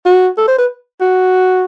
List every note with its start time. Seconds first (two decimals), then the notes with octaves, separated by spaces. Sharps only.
0.06 F#4
0.38 A4
0.48 C5
0.58 B4
1.00 F#4